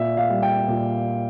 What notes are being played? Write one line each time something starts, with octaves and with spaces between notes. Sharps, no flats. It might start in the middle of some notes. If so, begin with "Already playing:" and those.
Already playing: A#2 E5
F5
G3
G5
A#2